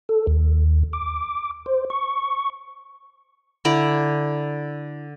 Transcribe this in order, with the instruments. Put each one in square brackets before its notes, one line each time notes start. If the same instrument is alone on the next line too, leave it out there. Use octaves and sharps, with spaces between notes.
[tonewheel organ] A4
D#2
D6
C5
C#6
[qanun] D3 E4 D5 A#5